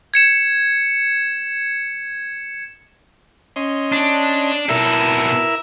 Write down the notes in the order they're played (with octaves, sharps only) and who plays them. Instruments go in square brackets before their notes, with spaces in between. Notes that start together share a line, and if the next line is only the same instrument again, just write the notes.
[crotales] G#6 C#7 E7
[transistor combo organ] C#4 D#5 C6
[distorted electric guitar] D4
[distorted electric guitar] B2 A4 [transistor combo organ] E4 A#4 E5